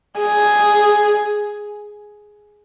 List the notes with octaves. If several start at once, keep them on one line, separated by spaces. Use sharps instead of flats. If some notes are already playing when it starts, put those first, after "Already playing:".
G#4